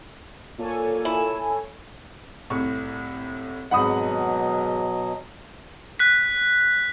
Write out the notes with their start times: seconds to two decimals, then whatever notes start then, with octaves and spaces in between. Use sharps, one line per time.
0.59 A#2 A4 C#5 G#5
1.05 E4
2.50 C2 A2 C#6
3.71 G#1 G#2 B2 F#3 D#5 F#5 B5 D#6
5.99 F#6 B6